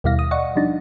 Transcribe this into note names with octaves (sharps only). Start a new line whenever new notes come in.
D#2 B2 G3 E4 F5 A#6
D#6
D5 D#5 F#5 C#6
F3 G3 D4 D#4